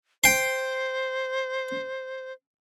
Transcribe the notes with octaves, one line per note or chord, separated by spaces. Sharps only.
C5 G5 C6